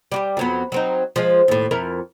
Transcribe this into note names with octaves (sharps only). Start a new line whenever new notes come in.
G3 F#4 G4
F2 F#3 B3
F#3 C4 D#4
F3 G#3
D#2 A2
F2 E4 A#4